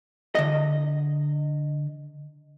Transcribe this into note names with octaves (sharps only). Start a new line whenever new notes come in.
D3 D#5